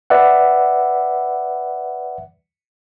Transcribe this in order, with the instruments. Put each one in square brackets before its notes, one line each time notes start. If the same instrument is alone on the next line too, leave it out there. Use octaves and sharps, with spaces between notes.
[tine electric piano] B4 D5 E5 F#5